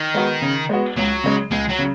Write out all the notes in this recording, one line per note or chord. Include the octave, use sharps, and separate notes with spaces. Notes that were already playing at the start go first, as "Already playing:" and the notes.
Already playing: D#3
G#3 B3 F#4
C#3
G#3 B3 F#4
C#2 F#3
C#3 G#3
C#2 G#3
F#3
C#3